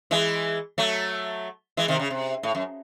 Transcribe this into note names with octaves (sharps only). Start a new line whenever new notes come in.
E3 G#3
F#3 A3
E3 G#3
C3 D#3
C#3
C3
A2
F#2